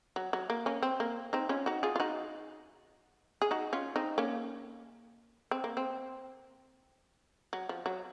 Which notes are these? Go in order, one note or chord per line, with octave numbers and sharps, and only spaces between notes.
F#3
F#3
A#3
A#3 C#4
C4
A#3
C4 D#4
C#4 F4
D#4 F#4
F4 G#4
F4
D#4 F#4
G#4
D#4 F#4
C#4 F4
C4 D#4
A#3 C#4
C4
A#3
C4
F#3
F3
F#3